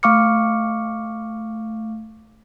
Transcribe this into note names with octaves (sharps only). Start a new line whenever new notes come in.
A3 F5 C#6 D6 F6 C#7